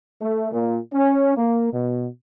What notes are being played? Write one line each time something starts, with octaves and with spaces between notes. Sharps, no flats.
A3
A#2
C#4
A#3
B2